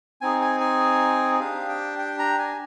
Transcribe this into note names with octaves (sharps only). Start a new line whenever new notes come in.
C4 D#4 G#4 G#5
G#5
G#5
D4 G4 F5
G5
G5
A#5
G#5